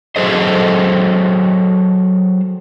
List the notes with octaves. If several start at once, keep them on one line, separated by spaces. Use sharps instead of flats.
F#3 G#4 A4 C5 D#5